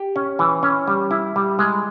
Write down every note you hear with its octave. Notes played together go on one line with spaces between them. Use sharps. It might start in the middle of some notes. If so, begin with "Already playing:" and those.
Already playing: G4
C#4
E3
C#4
G3
E4
G3
G#3